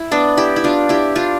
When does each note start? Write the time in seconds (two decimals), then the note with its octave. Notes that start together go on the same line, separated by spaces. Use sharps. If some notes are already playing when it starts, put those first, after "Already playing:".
Already playing: E4
0.11 B3 D4
0.37 E4 G4
0.56 E4
0.64 D4 F4
0.89 E4 G4
1.15 D4 F4